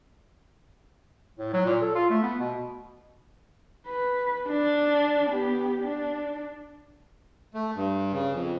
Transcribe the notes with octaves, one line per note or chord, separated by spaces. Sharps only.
A2
F#3
A#2
A4
F4
A3
B3
B2
B4
D4
B3 G4
D4
A3
G2
C#3
F2